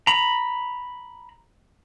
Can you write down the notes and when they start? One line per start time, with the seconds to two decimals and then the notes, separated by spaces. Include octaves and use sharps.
0.07 A#5 B5